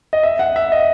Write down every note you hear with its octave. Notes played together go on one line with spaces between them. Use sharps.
D#5
E5
F#5
E5
D#5